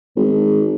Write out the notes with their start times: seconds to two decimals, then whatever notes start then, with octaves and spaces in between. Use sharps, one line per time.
0.16 G#1